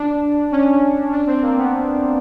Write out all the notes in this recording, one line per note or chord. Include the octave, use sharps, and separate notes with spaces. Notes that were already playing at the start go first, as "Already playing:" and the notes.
Already playing: D4
C#4
D4
C4
A#3
B3